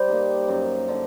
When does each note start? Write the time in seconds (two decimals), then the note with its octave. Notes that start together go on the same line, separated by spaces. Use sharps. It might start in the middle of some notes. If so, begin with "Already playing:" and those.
Already playing: G3 C5
0.08 A#3 D#4 G4
0.48 F#2
0.89 D3